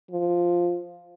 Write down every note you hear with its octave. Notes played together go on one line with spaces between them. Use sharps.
F3